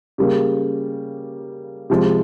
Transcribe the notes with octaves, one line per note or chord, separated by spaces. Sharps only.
C#3 G3 A#3
C3 F3 G#3